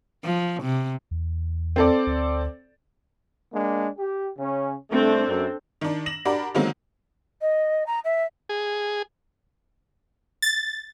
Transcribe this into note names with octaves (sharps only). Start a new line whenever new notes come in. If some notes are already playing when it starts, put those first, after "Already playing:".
F3
C3
E2
C4 A4 D5
D2
G#3 A#3 D4
G4
C#3 C#4
C2 A3 C4 D4 A4
F#2
D#3 D4
A#6 E7 F#7
D4 F#4 G4 A#4 D5 B5
D3 D#3 F#3 G#3 A#3 C4
D#5
A#5
E5
G#4
A6